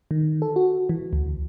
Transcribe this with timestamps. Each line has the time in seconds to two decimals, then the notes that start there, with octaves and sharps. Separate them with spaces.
0.11 D#3
0.42 A4
0.56 F#4
0.89 E3
1.13 D2